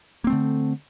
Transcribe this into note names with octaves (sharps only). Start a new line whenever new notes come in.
D3 A3 A#3 C4